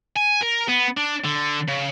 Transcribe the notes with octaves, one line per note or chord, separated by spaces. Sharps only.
G#5
A#4
B3
D4
D3
C#3